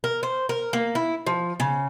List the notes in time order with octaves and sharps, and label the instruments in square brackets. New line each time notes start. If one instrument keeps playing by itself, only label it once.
[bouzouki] A#4
C5
A#4
A#3
E4
F3
C#3